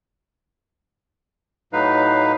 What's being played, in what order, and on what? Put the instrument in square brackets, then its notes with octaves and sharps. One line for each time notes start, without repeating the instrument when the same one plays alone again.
[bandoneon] A2 F#3 D#4 B4 F5